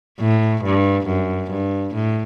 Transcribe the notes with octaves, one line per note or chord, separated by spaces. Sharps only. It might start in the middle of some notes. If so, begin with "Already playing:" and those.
A2
G2
F#2
G2
A2